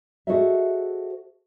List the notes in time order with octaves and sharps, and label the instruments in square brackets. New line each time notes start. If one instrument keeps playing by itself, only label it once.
[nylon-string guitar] F#4 G#4 A4 C5 D#5 E5